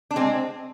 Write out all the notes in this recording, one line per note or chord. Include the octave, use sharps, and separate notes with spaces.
D4
G#3 C4